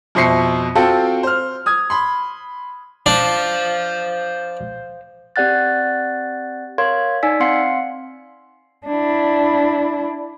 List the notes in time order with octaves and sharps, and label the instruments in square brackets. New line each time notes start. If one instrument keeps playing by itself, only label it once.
[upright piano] F2 B2 C5 E5 C7 C#7
C4 F4 F#4 A4 G5 A5
C5 F6
D#6 G#6
B5 C6
[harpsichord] D4 [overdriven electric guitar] C5 F5
[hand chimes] C4 G4 D5 F#5 F#6 A6
A#4 C#5 F5 C6 G#6
D#4 D5 G#5 E6 B6
C4 F5 F#5 C6 C7 C#7
[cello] D4 E4